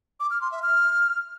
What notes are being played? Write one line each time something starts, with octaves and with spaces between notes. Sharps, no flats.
D6
F6
C6
E5
F6